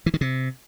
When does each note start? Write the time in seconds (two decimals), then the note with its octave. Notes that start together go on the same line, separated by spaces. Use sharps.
0.06 E3
0.14 D#3
0.21 C3